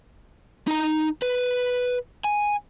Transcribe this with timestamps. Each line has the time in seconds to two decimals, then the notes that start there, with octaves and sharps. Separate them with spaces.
0.67 D#4 A#5
1.22 B4
2.24 G#5